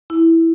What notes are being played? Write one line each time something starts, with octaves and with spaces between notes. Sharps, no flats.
E4